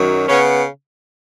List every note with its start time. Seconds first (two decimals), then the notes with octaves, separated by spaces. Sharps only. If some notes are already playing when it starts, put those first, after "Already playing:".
Already playing: F#2 D#3 F#3
0.28 C#3 B3 C#4